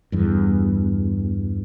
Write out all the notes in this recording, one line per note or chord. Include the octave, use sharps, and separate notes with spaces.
E2 G2